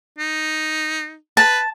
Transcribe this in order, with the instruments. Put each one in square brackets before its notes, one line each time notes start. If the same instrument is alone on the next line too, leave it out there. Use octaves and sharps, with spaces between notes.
[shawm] D#4
[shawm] B4 [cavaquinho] A5